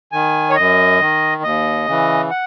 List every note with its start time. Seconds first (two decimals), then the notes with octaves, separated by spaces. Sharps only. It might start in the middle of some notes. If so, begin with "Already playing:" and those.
0.12 D#3 G#5
0.50 C#5
0.56 F#2 D#5
1.00 D#3
1.43 D#2 D#5
1.86 C#3 E3
2.30 F#5